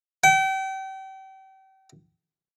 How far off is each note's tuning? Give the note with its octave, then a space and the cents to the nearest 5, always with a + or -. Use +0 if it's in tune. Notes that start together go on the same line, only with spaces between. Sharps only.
G5 -35